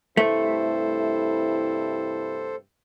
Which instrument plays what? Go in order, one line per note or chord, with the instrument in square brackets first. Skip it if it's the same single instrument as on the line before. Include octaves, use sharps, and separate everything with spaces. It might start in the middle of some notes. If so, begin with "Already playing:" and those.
[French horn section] G2 C3 E4 [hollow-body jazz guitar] A3 [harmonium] A4 C5